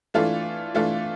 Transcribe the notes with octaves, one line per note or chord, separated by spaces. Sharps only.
E3 A3 D4 F4 A4
E3 A3 D4 F4 A4